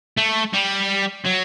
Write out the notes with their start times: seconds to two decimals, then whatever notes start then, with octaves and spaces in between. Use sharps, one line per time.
0.17 A3
0.54 G3
1.26 F#3